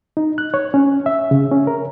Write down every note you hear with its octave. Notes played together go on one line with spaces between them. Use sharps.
D#4
F#6
C#5
C#4
E5
C#3
C#4
A#4